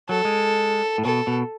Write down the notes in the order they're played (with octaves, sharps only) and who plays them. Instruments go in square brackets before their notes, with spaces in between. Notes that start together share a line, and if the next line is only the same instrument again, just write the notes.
[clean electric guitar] F#3 [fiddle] A4
[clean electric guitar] G#3
A2
[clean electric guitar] B2 [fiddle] A4
[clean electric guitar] B2